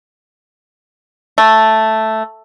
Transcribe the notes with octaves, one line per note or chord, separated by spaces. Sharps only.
A3